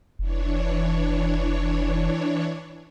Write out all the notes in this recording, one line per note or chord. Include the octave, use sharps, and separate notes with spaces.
F1 E3 D4 C#5